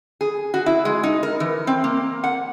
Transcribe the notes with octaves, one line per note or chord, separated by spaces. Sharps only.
G#4
F#4
E4
G#3
D#4
A#4
E3
C4
A#3
F#5